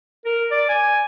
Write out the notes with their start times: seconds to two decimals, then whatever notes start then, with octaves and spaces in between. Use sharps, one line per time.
0.26 A#4
0.51 D5
0.69 G#5